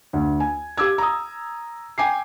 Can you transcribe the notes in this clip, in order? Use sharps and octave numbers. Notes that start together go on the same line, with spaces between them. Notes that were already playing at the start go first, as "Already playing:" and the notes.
D2
G#5
G4 D6 E6 G#6
A#5 D#6
G5 G#5 D6 C7